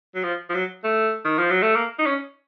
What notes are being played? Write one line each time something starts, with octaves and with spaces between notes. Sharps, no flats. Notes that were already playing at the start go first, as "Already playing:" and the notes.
F#3
F3
F3
F#3
A3
D#3
F3
F#3
A3
A#3
D#4
C#4